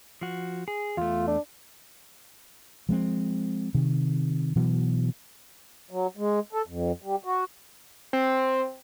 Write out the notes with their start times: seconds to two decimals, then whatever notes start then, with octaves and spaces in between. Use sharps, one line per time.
0.21 F3 F#4
0.68 G#4
0.97 E2 A3 F4
1.28 D4
2.89 F3 G#3 C4
3.75 C3 D#3
4.56 B2 E3 F#3
5.91 F#3
6.17 G#3
6.53 A4
6.67 F2
7.02 G3
7.24 F#4
8.13 C4